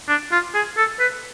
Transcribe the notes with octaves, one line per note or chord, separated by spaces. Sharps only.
D4
F4
G#4
A4
B4